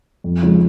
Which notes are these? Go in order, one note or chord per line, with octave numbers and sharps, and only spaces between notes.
F2
C#3 F3 G#3